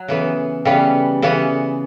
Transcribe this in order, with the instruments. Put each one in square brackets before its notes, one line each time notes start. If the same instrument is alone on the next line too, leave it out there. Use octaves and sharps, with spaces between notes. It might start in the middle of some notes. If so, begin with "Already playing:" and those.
Already playing: [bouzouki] F#3
[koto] C#3 E3 B3
[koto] C#3 E3 B3 [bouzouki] G3
[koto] C#3 E3 B3